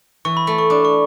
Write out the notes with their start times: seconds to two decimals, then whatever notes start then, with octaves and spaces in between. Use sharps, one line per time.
0.25 E3 C#6
0.37 B5
0.47 A3 B5
0.58 C#6
0.70 D4 D6
0.85 C#6